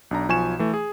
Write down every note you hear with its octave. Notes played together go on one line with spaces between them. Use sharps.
B1 D4 A#5
B1 F3 G#5 C#6 E7
E3 A3
G#4